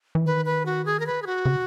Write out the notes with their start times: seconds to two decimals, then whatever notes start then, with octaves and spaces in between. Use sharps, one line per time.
0.15 E3
0.26 D#3 B4
0.45 B4
0.66 F#4
0.86 G#4
1.00 A#4
1.07 B4
1.22 G#4
1.26 F#4
1.45 C#3